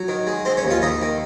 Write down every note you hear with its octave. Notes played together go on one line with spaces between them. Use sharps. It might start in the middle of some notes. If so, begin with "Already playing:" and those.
Already playing: F#3
D#3
G#3
G#3 C4 C5
C#4 C#5
D#2
F4 F5
D#2 D#4 D#5
D#3